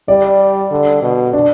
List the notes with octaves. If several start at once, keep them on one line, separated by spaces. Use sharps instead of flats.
G3 D5
D3
B2
D4